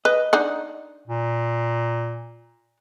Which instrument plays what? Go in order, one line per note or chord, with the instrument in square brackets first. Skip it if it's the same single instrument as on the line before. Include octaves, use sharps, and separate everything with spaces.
[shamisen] B4 [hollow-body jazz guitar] D#5
[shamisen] D4 D#4 F#5
[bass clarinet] A#2